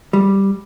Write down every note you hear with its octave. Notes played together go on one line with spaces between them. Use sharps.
G3